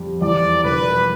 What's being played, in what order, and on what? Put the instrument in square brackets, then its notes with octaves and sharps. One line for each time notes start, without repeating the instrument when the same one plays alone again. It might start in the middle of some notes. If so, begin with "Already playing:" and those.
Already playing: [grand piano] F2 G3
[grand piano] E2 [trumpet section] D5
[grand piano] E1 [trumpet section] B4